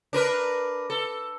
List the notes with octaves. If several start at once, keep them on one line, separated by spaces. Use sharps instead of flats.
D4 A#4 B4
A4